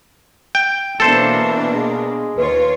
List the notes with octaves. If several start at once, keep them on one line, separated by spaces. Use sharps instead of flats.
G5
B2 E3 A#3 D4 A4 C5
G#3
D#2 F4 B4 C#5